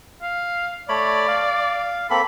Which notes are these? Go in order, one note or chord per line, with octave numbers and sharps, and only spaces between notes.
F5
A3 C#5 D5 B5
F5
A#3 C4 A4 B5